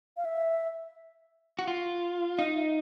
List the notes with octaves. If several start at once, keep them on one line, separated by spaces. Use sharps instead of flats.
F5
E5
F#4
F4
D#4 F5
E5